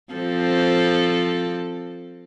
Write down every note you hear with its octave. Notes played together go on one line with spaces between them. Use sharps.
F3 C4 A4